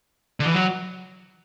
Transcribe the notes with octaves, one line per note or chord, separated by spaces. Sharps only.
D3
E3
F#3